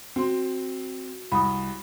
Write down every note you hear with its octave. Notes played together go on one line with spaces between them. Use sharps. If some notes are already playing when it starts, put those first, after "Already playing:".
C4 F#4 C6
C2 B5 D#6